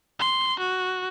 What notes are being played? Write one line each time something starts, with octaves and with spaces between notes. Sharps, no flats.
C6
F#4